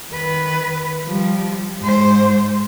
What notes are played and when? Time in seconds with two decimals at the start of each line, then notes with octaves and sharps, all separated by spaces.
0.11 D#3 B4
1.06 F3 G3
1.80 G#2 C5